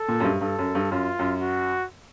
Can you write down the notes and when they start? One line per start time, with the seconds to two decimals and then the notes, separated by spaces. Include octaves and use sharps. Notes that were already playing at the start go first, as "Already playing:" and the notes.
Already playing: A4
0.08 A#2
0.20 F#2
0.24 G2
0.41 G2 A4
0.59 F#2
0.75 G2
0.91 F#2 F4
1.19 F#2
1.41 F#4